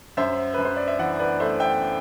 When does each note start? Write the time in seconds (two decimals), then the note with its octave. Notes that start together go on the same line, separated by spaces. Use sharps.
0.17 F#2 C5 E5
0.54 F#2 B4
0.65 C5
0.77 D5
0.88 E5
0.99 E3 D5 F#5
1.19 B4 D5
1.40 A3 C5 E5
1.60 E5 G5